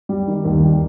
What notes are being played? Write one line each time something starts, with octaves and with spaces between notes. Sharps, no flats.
G3
D#3
D#2
G3